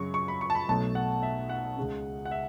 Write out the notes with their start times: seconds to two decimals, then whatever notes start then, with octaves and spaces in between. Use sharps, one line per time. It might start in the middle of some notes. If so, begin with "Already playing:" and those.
Already playing: F#2 C#3 F#3 C#6
0.14 C#6
0.28 B5
0.41 C#6
0.50 A5
0.55 B5
0.69 B1 B2 F#3 A3 A5
0.95 F#5
1.23 E5
1.49 F#5
1.77 C#2 C#3 G#3 C#4
2.25 F#5
2.31 E5